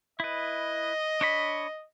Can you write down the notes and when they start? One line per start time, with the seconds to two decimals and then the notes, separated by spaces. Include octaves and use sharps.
0.20 E4 B4 D#5
1.21 D4 C#5 B5